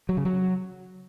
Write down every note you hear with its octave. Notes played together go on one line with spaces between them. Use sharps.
F#3
C#3
F#3